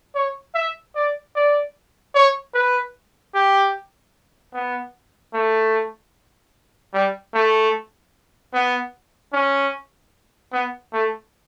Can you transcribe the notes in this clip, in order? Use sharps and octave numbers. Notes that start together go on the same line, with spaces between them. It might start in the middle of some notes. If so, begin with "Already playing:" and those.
C#5
E5
D5
D5
C#5
B4
G4
B3
A3
G3
A3
B3
C#4
B3
A3